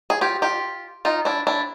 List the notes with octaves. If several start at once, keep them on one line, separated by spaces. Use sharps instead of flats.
G#4
F4 G4
F4 G4
D#4 F4
D4 E4
D4 E4